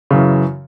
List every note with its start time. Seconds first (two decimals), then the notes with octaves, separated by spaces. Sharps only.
0.11 C#3
0.13 F#2
0.16 E3